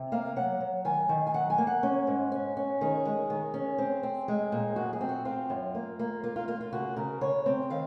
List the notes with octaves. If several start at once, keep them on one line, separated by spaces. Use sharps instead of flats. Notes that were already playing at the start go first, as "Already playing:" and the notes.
Already playing: C3
A#3 F5
F#3 F#5
F#3
D#3 G#5
D#3
G#5
F#3 F#5
G#5
A#3
F#5
C#4
G#2
C#4
C#4
D#3 G#4
G#3
D#3
C#4
C4
C4
G#3
A#2
F#2 F#4
G#4
C4
F#4
C4 F4
F#2
A#3
A#3
A#3 F4
F4
A#3 F4
F4
C#3 F#4
C#3 A#4
C#3 C#5
C4
D#3 F5